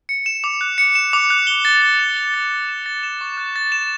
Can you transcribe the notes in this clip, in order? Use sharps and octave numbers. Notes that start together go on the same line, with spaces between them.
C#7
E7
D6
F#6
C#7
E7
D6
F#6
G7
A6
A6
E7
G7
A6
A6
E7
A6
E7
C#6
F#6
A6
E7